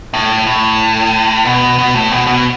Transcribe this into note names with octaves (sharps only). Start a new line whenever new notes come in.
A2
A2
B2
B2
A2
B2
B2